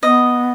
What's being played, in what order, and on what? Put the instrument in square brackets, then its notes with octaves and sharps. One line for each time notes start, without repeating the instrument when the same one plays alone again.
[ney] B3 [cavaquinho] D#5